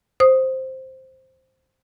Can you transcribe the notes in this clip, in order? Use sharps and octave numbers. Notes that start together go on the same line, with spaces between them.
C5 D#6